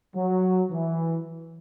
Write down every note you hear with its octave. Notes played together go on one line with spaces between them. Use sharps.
F#3
E3